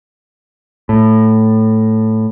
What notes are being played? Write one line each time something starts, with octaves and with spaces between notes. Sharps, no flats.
A2